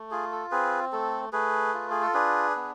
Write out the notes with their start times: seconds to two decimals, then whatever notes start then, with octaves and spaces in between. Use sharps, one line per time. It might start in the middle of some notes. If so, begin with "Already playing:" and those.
Already playing: A3
0.11 F4 G#4
0.32 A4
0.51 C4 G#4 B4
0.92 A3 A4
1.33 A3 G#4 B4
1.74 F4
1.91 G#4
2.02 A4
2.14 D4 G#4 B4
2.56 B3